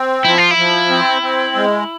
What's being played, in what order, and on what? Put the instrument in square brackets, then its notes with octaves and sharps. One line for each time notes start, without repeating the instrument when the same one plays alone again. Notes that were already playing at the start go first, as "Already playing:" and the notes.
Already playing: [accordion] C4
[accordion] F3 [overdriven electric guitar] E4
[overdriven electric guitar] F4
E4
[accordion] F3
C4
C4
G#3